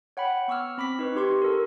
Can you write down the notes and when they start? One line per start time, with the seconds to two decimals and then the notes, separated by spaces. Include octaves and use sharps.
0.17 C#5 F#5 G5 B5
0.48 B3 C#6 D6 E6 F6
0.78 C4 B5 D6 B6
0.99 D#4 B4 C#6
1.16 D#4 G4 C6 C#6
1.42 A4 A#4